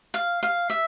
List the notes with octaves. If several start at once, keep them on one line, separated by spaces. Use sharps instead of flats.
F5
F5
E5